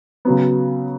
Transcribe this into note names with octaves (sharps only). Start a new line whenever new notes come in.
C#3 F#3 B3